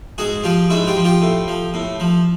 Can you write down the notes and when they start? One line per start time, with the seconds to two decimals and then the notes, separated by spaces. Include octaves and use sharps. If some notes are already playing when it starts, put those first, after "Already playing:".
0.18 G#2 F#4 G#4
0.44 F3 F4 G4
0.70 G#2 E4 F#4
0.87 F4 G4
0.96 F3
1.04 F4 G4
1.22 A2
1.48 F3
1.74 A2
2.00 F3